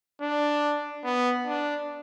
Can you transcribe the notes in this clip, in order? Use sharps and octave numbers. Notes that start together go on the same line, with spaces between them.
D4
B3
D4